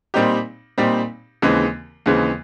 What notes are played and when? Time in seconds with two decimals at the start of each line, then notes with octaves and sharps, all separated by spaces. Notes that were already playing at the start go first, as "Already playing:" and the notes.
0.14 A#2 G3 C4 D#4 G4
0.78 A#2 G3 C4 D#4 G4
1.42 D#2 C#3 E3 G#3 C4
2.06 D#2 C#3 E3 G#3 C4